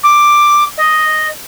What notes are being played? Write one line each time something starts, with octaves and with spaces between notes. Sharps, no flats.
D6
D#5